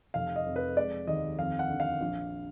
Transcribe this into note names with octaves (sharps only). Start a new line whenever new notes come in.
F1 F5
D#5
F2
B4
G#3 D5
D#2 D#5
F2 F5
F#5
D3
F5
A#1